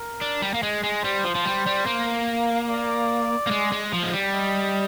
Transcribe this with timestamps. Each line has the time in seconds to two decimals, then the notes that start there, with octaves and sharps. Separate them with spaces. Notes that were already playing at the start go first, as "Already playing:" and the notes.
Already playing: A#4
0.21 D4
0.42 G3
0.54 A#3
0.63 G#3
0.83 G#3
1.03 G3 C5
1.24 F3
1.35 F3
1.45 G3
1.66 G3
1.86 A#3
2.69 D5
3.47 A#3
3.51 G#3
3.72 G#3
3.93 F3
4.03 G#3
4.13 G3
4.34 D#5